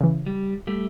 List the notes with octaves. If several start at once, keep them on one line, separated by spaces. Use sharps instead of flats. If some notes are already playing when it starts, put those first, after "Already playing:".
C#3 E3
G3
G3 A3